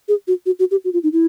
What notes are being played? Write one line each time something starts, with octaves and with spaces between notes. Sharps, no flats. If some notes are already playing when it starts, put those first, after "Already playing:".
G#4
F#4
F#4
F#4
G4
F#4
F4
D#4
E4